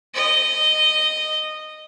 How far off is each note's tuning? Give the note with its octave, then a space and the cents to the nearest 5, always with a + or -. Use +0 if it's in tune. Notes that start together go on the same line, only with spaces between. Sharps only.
D#5 -10